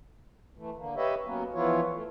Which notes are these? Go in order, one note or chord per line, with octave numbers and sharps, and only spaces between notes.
E3 A3
D3 A#3
G4 B4 C#5 D#5 E5
F#3 A#3 B3 C#4
E3 F3 B3 E4 F4 C#5
A3